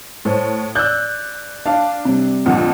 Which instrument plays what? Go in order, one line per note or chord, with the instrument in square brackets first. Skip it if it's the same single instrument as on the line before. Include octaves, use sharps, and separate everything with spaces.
[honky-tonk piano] A2 [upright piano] A4 C5 C#5
[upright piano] D5 E6 [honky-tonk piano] F#6 G6
[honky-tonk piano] D4 [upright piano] F5 A5
[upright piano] C3 G3
[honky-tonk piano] F2 A#2 D3